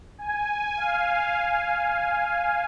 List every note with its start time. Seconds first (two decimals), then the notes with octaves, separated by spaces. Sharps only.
0.18 G#5
0.77 F5